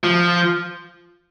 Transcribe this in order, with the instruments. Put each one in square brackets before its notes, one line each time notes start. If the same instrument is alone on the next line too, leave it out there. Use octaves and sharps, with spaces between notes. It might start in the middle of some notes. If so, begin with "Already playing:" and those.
[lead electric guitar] F3